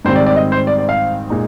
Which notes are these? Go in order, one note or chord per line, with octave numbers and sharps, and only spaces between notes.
G#2 D#3 G3 C4 C5
D5
D5
D#5
C5
D5
D5
F5
A#2 G#3 D#4